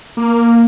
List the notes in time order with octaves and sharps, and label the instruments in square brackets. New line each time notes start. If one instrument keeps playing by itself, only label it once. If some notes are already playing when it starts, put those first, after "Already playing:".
[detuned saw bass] A#3